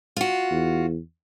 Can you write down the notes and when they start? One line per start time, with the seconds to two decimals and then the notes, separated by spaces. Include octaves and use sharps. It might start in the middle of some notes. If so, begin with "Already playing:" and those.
0.17 F4 F#4
0.51 E2